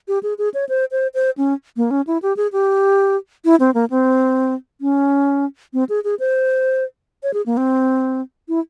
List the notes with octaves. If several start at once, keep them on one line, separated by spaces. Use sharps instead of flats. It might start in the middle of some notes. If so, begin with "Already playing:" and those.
G4
G#4
G#4
C#5
C5
C5
C5
C#4
A#3
C#4
E4
G4
G#4
G4
E4
C4
A#3
C4
C#4
C4
G#4
G#4
C5
C#5
G#4
A#3
C4
E4